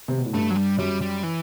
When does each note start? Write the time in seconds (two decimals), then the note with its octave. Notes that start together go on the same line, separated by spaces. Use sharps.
0.08 C3
0.17 B2
0.26 A2
0.33 G2 A3
0.50 F#3
0.56 G3
0.78 F#2 G3
1.01 G3
1.23 E3